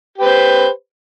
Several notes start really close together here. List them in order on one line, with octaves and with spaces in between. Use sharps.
G4 B4 C5